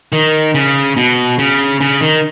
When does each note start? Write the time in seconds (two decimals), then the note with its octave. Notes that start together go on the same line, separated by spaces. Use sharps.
0.13 D#3
0.55 C#3
0.97 B2
1.39 C#3
1.81 C#3
2.01 D#3